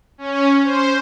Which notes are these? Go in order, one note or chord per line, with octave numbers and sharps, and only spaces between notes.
C#4
C5